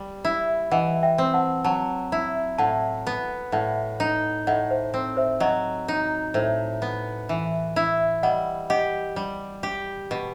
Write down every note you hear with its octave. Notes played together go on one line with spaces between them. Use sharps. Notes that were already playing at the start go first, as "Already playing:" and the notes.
Already playing: G3
E4
E3 D#5 F#5
E5 G5
C4
F#5 A5
F#3 F#5 A5
E4
A2 F#5 A5
B3
A2 F#5 A5
D#4
A2 D#5 F#5
C5
C4
C5 E5
F#3 D#5 F#5
D#4
A2 C5 E5
B3
E3
E4
G3 D#5 F#5
G4 D#5 F#5
G3
G4
B2